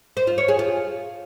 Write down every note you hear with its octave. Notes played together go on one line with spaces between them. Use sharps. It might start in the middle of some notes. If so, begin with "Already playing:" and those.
C5
F4
C#5
G#4
F4